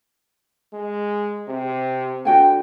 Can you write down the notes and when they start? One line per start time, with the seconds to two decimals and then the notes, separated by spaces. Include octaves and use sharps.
0.73 G#3
1.48 C3
2.25 D3 F#4 G5 G#5